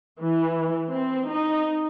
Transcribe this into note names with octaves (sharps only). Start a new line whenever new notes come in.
E3
C4
D#4